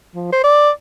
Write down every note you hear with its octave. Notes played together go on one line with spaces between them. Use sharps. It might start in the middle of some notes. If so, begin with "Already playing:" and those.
F3
C5
D5